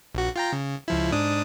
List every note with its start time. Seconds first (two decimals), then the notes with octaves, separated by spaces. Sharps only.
0.15 A#1 F#4
0.36 F4 G5 A#5
0.53 C#3
0.88 C#2 F3 E4
1.12 G#2 D4 D#6